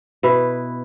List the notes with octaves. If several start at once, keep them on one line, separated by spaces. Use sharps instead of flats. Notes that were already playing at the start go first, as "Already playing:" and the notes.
B2 E4 B4